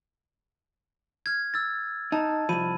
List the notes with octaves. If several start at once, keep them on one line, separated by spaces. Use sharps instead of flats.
F6 G#6
E6 A6
D#4 A5
C2 F3 B5 D#7